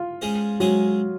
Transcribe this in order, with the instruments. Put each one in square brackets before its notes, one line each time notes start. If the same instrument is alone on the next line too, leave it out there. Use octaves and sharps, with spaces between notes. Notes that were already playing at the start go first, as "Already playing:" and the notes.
Already playing: [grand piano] F4
[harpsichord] G#3 C#4 G#4 C5 D#5
[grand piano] F#3 [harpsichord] G#3 C#4 G#4 C5 D#5